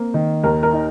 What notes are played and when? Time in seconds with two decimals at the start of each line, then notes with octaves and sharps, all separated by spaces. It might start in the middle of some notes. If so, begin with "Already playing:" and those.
Already playing: A#3 C4
0.14 D#3
0.43 D#2 A#4
0.63 A#4
0.73 D#4